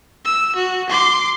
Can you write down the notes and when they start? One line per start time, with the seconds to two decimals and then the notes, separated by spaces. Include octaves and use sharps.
0.25 E6
0.56 F#4
0.90 C6 D6